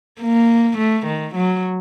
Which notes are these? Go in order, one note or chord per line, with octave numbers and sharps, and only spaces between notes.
A#3
A3
D#3
F#3